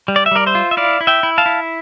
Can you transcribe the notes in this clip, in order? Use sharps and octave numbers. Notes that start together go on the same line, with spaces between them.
G3
D5
E5
G3 A#4 D5
C5 E5
F4
E5
E4 D5 F5
E4
E5 G5
E4
F5 A5
E4